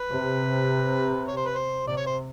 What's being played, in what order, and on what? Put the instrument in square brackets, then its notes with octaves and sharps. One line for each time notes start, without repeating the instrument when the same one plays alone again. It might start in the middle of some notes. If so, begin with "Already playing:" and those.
Already playing: [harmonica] B4
[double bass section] C3
[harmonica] C#5
C5
B4
C5
[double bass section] C3 [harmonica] D5
[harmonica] C#5
C5